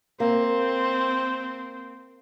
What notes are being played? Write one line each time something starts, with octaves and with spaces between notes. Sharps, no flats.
A#3 C4